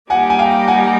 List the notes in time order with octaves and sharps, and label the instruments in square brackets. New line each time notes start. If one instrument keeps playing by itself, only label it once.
[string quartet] G3 A#3 D#4 G4 [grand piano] F#5 G#5
[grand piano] G#5
F5 G5
F#5 G#5